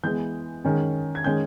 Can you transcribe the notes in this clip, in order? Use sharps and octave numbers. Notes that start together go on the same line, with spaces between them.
E3 G#3 B3 G6
D#3 G#3 C#4
G#6
D#3 G#3 C#4 G6